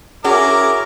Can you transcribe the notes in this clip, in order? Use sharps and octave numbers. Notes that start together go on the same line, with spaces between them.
C#4 E4 F#4 G#4 A#4 D6